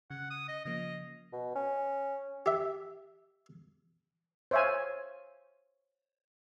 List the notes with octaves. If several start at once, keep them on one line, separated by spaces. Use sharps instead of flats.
C#3 F#5
D#6
D#5
C#3 F3 A#3 D#5
B2
C#4
G4 E5
C5 C#5 E5 F5 G#5